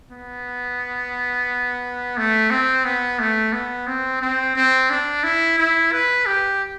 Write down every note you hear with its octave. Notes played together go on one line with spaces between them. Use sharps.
B3
A3
C4
B3
A3
B3
C4
C4
C4
D4
E4
E4
B4
G4